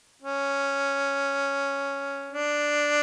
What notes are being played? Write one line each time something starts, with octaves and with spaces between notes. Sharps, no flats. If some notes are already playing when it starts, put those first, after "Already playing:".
C#4
D4